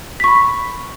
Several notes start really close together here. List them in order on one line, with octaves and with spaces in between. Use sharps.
B6 C#6 B5